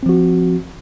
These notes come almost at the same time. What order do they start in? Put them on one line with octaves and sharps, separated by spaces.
C4 F3 F#4